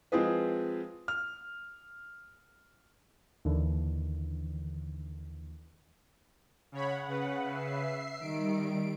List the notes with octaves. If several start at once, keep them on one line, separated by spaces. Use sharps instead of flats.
F3 G#3 C4 F4 G#4 B4
F6
D#2 D3 E3
C#3 C#5 F#5 B5
C#3 B4
E5 C7
D#3 G3 D7